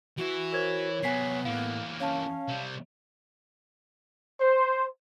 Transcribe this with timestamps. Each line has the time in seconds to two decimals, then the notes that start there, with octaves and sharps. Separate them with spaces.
0.18 E3 E4 F#4
0.52 A#4 C5 C#5 G#6
1.03 C3 F#3 B3 G#5 B6 C7
1.45 A2 E3 A#3 F5
2.00 C#4 C#5 F5 A5
2.48 C3 G3
4.41 C5